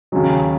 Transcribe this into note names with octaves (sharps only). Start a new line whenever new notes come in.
D#2 C#3 F#3 G#3